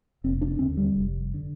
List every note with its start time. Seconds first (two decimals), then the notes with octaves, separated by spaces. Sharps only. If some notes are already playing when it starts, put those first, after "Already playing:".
0.24 F1 C4
0.41 D4
0.59 D#2 D3 C4
0.77 G3
0.95 F1
1.34 D3